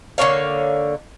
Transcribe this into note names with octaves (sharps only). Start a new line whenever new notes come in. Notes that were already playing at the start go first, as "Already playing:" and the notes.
D3 A#3 C#5 F5